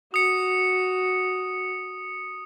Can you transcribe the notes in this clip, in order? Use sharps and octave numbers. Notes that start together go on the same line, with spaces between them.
F#4 D#6 C#7